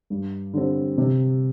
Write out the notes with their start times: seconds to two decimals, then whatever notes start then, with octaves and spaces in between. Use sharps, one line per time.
0.10 G2
0.54 D3 G3 C4
0.98 C3